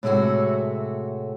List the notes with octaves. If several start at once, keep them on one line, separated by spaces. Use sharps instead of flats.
A2 C3 G#3 A3 F#4